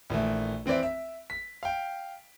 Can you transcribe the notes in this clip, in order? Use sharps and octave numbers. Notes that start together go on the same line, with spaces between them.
A#1 E3 A3
E3 C4 B4 D5 E5
E5
B6
F5 G5